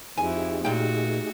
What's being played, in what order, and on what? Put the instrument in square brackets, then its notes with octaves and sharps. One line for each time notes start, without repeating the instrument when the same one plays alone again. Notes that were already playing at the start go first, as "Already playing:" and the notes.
[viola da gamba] F2 E4 [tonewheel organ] D#4 G4 G#4 [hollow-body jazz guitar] G#5
[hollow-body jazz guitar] A#2 G5 [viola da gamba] A3 F#4